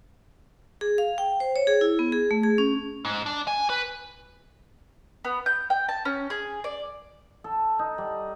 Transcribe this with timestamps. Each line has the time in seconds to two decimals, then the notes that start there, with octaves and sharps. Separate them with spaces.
0.81 G#4
0.98 F5
1.18 G5
1.40 C5
1.56 C#5
1.67 G#4
1.81 E4
1.99 B3
2.12 G#4
2.31 A3
2.43 G#4
2.58 C#4
3.05 G#2
3.26 D4
3.47 G#5
3.70 B4
5.25 B3
5.46 G6
5.70 G5
5.89 A5
6.05 C#4
6.30 G#4
6.64 D5
7.44 A4
7.79 D#4
7.98 G3